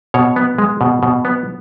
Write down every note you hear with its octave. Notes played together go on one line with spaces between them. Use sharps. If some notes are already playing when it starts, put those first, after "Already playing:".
B2 C#5
B3
G#3
B2
B2
B3